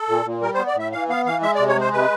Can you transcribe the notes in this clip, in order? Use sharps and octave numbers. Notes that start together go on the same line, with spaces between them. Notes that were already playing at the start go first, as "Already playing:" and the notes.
Already playing: A4
A#2
A#2
G3 A#4
C5
B3
D5
A2 E5
E3 F5
B3 F5
E3 F5
G#3 E5
D5
C3
C#5
G#3 C5
C3 B4